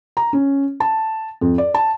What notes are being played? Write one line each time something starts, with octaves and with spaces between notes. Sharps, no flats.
A#5
C#4
A5
F2
D5
A5